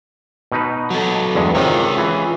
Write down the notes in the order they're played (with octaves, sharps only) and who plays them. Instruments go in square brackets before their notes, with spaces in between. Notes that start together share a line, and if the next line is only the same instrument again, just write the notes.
[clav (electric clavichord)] B2 D#4 B4
[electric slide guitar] F#3 A4
[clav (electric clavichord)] E2 G2 G#3
[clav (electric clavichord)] C3 D#3 [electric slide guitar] F4 G#4 C#5
[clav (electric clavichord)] E3